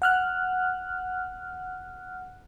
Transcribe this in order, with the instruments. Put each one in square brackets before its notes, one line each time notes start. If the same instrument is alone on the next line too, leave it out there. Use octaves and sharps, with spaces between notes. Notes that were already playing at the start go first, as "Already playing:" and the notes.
[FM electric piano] F#5 F6 F#6